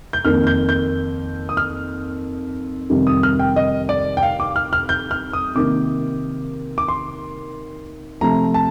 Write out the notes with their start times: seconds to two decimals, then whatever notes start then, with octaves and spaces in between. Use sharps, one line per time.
0.13 G6
0.25 F2 D#3 A#3 F6
0.47 G6
0.69 G6
1.49 D#6
1.57 F6
2.90 F2 C3 D#3 G3
3.07 D#6
3.23 F6
3.39 G5
3.56 D#5
3.89 D5
4.17 G5
4.23 F5
4.40 D6
4.56 F6
4.73 F6
4.89 G6
5.11 F6
5.33 D#6
5.55 C3 D#3 A#3 D6
6.78 D6
6.88 C6
8.21 C3 F3 A3 A#5
8.54 A5